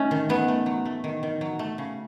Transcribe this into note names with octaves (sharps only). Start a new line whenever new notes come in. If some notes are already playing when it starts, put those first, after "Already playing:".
Already playing: A3 C#4 D#4
D#3
D#3 B3
A3
F#3
A3
D#3
D#3
F#3
A3
C#3